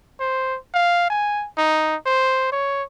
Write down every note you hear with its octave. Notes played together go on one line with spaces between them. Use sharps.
C5
F5
G#5
D#4
C5
C#5